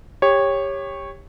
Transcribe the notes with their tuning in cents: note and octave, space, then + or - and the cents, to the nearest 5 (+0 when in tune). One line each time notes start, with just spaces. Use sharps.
G4 +20 C#5 -10